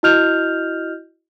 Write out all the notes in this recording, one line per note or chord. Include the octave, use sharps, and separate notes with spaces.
E4 F#4 D#5 F6 G6 F7